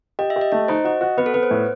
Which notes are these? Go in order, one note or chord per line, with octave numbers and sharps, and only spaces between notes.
G4 D#5
E5
G4
D#5
A3 D#5
D#4 C5
F#4 D#5
F#4
B3 B4
A4
B3 B4
C5
A2